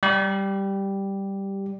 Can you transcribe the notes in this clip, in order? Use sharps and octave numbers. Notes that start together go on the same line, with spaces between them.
G3 G4